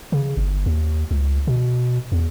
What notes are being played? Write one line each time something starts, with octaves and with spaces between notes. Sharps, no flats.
C#3
G1
D#2
C#2
B2
E2